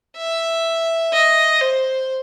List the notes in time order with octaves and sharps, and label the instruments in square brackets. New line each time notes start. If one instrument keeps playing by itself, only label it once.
[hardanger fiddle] E5
D#5
C5